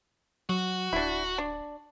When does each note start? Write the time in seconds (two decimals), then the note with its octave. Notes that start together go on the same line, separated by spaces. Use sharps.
0.49 F#3 F#4
0.93 D1 D4 E4
1.38 D4